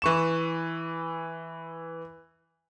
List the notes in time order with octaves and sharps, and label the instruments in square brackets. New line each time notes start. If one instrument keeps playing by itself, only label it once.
[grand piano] E3 C#6 E7